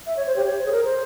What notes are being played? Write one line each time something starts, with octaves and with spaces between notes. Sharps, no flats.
E5
C#5
C5
G4
C#5
C5
G#4
A#4
C5